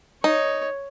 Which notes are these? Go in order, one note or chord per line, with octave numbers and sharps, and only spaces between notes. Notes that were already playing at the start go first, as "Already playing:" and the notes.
D#4 C#5